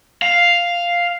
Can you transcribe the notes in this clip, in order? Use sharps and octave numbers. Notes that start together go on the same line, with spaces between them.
F5